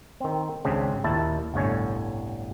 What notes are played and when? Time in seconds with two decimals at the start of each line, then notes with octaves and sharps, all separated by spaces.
0.20 D#3 C4
0.65 G#1 C#2 C#3 C4 D4 G#4
1.04 D#2 A#2 D#3 E4 A5
1.54 G1 C2 A2 D3 C#5 G#5